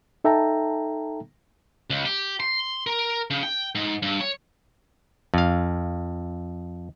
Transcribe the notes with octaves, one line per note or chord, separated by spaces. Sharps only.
D#4 A4 E5 G5 A5 A#5
C#2
G4
C6
A#4
C#3
G5
G#2
G2
C#5
F2 F5